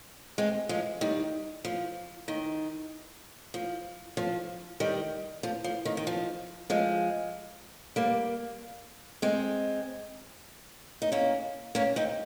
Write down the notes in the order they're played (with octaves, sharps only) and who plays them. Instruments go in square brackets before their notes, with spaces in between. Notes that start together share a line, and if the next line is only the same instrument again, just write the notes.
[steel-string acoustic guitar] G#3 C4
F3 G#3
D#3 G3
F3
D#3
F3
F3
D#3 G3
F3
F3
D#3
D#3
F3
F3 G#3
G3 A#3
G#3 C4
D#4
A#3 C#4
A#3 C#4
C4 D#4